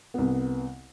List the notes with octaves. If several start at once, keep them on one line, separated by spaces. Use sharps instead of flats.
C2 B3